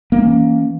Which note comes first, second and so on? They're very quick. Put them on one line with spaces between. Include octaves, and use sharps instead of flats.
A#3 C4 C#4 E3